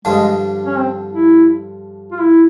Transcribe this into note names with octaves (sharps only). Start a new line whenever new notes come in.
G2 D3 F3 G#3
C#4
C4
E4
F4
E4